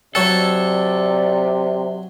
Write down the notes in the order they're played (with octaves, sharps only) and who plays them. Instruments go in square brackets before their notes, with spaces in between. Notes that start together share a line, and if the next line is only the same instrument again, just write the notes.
[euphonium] C3 [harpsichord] F#3 C#5 F#5 [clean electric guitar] A4 [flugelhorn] D5